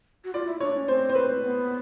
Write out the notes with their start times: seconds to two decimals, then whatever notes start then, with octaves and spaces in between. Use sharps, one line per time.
0.24 F#4
0.33 F4 D5
0.47 E4
0.60 D4 C#5
0.74 C#4
0.88 C4 C5
1.10 C5
1.15 B4
1.36 A#3
1.42 B3